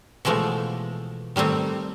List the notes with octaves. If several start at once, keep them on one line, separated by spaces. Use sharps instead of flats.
B2 E3 F3 G#3 A3
D#3 G3 A3 C4